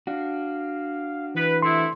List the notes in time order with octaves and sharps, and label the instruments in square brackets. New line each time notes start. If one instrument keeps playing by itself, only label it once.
[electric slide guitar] D4 F#4 [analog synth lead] F5
[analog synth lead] E3 [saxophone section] B4
[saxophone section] C3 A3 E4 [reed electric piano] C6